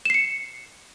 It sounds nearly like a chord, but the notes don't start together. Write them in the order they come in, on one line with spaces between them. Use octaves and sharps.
E7 C7 C#7